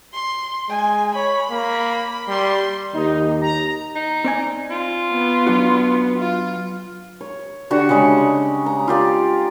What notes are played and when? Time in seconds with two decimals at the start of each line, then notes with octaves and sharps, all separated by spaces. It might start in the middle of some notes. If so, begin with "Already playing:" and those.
0.13 C6
0.69 G#3 G#5
1.15 C#5 B5
1.51 A#3
2.29 G3 C6
2.94 D#2 D#4 G4
3.42 A#5
3.96 D#4
4.24 C4 D5 G#5
4.71 F4
5.11 B3
5.47 F#3 D4 F#4
6.19 F4
7.21 C#5
7.71 D3 F#4 G4 C#6
7.89 C#3 G3 G#3 C#6
8.66 A#5
8.88 F4 G4 D5 F5